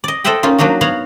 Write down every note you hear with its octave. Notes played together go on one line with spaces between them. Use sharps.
D5 D#5
A4 C5 D#5 E5 F#5 G5
A#3 C#4 D#4 F4
F#3 A#3 D4 D#4 F#4
B3 F#4 C#5 F5 F#5